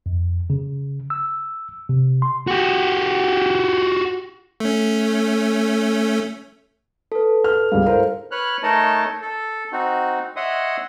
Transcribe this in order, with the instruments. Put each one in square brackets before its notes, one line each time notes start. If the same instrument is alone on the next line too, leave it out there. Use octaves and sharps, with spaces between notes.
[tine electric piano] F2
C#3
E6
C3
C6
[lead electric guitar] F#4 G4
[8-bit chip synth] A3 C#4
[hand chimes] A4 B4
[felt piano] F6
[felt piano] C#2 G2 [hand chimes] F5
[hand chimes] E4 [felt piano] A4 A#4 C5
[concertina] B4 C#5 F6 F#6
A3 D#4 A#4 C#5 D#5 A5
A4
C4 D#4 F#4
C#5 D#5 E5 F#5 C6 D#6